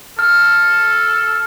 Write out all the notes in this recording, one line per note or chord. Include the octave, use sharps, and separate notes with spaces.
A4 F6